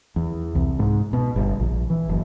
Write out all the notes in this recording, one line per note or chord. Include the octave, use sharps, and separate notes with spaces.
E2
C2
G#2
B2
G1
A#1
E3
F#1